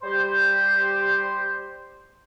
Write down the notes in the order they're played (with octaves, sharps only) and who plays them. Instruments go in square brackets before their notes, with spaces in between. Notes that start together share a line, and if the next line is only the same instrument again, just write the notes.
[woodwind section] G3 G4 C5